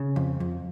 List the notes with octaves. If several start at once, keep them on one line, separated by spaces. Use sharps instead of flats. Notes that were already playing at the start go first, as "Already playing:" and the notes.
Already playing: C#3
F2
F2